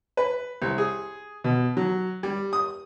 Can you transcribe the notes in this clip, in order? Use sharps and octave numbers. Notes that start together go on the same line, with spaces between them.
B4
C2
G#4
B2
F#3
G3
D#6